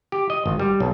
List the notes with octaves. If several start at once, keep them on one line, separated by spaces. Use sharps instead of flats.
G4
D#5
G#1
G3
B1